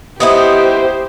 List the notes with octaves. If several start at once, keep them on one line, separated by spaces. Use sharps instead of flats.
B3 D#4 E4 G4 C5